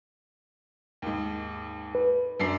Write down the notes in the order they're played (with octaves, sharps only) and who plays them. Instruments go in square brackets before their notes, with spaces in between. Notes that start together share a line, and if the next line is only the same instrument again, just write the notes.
[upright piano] D#2 G#2
[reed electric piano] B4
[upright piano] F#2 D4 C7